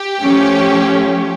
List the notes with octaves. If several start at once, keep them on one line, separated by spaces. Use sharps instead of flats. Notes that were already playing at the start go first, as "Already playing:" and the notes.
Already playing: G4
F3 A3 C#4